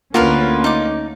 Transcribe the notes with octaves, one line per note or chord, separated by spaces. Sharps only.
D2 D3 A#3 C#4 F4 F#4 A#4 B4
D#4 D6